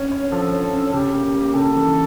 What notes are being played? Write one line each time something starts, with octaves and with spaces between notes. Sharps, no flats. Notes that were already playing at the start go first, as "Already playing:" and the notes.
Already playing: C#4 C#5
C#5
F3 A4
C#5
C#4
C#3 G4
A#3
A#3
C#3 A4
E3